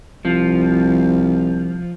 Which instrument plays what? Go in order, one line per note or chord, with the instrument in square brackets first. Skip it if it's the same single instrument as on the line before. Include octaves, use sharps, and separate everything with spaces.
[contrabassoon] C2 [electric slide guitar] F3